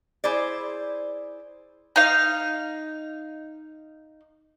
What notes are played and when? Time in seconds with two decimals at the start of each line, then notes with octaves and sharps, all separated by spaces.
0.24 E4 G#4 C5 D5
1.96 D#4 F5